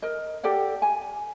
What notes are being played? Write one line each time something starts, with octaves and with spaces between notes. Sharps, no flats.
A#4 D#5
G4 A4 D5 F#5
G#5